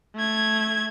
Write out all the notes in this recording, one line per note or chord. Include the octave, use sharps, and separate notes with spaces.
A3 G#6